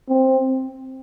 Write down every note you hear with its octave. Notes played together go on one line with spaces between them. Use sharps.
C4